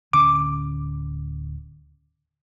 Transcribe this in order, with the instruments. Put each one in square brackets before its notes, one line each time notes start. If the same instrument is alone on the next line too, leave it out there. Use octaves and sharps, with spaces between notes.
[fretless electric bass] D1 D3 C#4 [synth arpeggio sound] D6